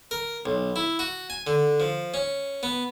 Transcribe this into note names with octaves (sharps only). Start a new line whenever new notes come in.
A#4
B1
E4
F#4
G#5
D3
F3
C#4
B3